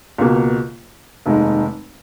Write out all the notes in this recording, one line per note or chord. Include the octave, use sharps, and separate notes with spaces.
C#2 B2 A#3
F1 D#2 D#3 G#3 D#4